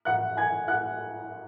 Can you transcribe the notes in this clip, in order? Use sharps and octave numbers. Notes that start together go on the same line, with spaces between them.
F#5 F#6
G#5 G#6
F#5 F#6